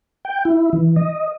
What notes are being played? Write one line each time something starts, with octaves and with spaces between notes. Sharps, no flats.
G5
E4
E3
D#5